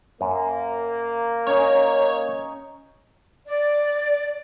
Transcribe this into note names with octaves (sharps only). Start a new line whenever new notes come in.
F#2 A#3
C#4 D#4 C#5
D5